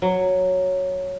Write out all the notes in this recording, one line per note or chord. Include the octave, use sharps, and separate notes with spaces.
F#3